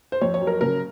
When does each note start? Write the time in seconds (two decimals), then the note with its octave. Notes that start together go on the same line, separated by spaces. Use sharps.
0.12 C5
0.21 F2 C#5
0.34 C#5
0.41 F#3
0.47 A#4
0.61 C#3 A#4